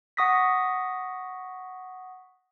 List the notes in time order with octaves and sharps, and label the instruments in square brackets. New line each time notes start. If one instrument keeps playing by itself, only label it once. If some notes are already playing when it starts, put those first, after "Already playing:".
[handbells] F#5 C#6 D#6 A#6 B6